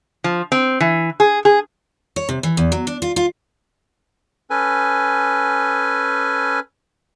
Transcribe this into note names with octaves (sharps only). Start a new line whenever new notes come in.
F3
C4
E3
G#4
G#4
C#5
C3
E3
E2
F#3
D4
F4
F4
C#4 A4 B4 G#5